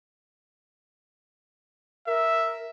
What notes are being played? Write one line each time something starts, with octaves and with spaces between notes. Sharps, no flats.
A#4 E5